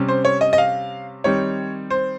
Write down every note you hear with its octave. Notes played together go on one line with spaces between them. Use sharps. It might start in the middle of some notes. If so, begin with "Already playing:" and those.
Already playing: C3 G3 C#4
C5
C#5
D#5
D#5
F5
D#3 G3 C4 D#4 C#5
C5